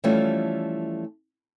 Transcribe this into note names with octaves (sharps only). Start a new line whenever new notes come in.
E3 F3 G3 A3 C#4 F4